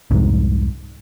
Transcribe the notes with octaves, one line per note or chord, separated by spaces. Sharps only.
C2 F2 G#2